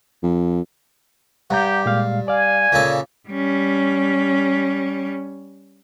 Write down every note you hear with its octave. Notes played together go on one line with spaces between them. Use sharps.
F2
G2 G4 F#5 A#5 G6
A#2 G#3 F5
D5 F5 G#5
A#2 C#3 A4
G3 C#4